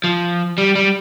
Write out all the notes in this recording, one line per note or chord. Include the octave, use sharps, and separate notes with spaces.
F3
G3
G3